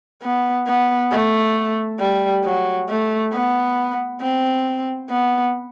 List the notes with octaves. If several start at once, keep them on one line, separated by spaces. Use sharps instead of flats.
B3
B3
A3
G3
F#3
A3
B3
C4
B3